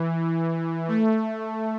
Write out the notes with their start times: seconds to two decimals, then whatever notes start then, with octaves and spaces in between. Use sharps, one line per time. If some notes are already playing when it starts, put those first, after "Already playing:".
Already playing: E3
0.88 A3